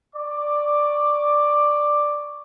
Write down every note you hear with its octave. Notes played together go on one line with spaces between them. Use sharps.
D5 C#6 D6